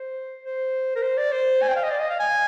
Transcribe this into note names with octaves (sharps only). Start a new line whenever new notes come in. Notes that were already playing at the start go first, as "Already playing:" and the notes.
Already playing: C5
C5
A#4
C5
D5
C5
G#5
G5
F5
D#5
D5
D#5
F5
G#5